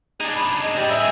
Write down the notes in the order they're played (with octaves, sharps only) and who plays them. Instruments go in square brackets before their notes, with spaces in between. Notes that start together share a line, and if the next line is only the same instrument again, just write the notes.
[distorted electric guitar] D4 D#4 [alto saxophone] G#4
[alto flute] B5
D#5
[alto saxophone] G3 [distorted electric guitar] C4 G#4
[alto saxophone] E5